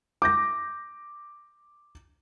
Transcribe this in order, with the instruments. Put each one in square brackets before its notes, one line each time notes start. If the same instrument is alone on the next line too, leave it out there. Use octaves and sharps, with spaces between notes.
[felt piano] D6 G6 A#6